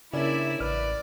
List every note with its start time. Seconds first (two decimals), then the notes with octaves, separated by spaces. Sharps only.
0.13 C#3 A#3 C#4 D4 E4 D5 E5
0.60 A1 B4 D5 F6